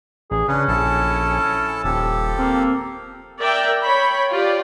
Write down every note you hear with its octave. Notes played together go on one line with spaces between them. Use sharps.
A1 G#4
C#3 C#4 D4 B4
A#1 E4 A4 A5
D#1 F3 G4 A4
A#3 C4
A#4 D5 E5 G5
C#5 G5 B5
F4 G4 D5